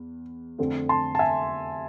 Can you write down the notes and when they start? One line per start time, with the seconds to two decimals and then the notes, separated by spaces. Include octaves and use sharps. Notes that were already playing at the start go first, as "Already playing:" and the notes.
Already playing: E2
0.58 F2 D3 A3 C4
0.89 A5 C6
1.15 A5
1.19 E5 G#5